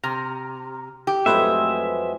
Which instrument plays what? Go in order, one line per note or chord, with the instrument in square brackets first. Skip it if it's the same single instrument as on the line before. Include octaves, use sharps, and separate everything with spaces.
[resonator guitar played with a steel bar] C3 [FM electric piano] A#5 F6
[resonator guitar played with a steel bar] G4
[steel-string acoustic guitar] F2 F#3 G#3 [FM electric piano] A3 B4 C5 [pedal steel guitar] E5